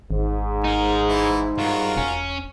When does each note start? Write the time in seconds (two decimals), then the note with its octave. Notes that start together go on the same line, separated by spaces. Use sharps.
0.11 G#1 G#2
0.64 D#4 G#4 A#4
1.08 E3 E4
1.58 G2 F4 F#4 A#4
1.97 E1 C#4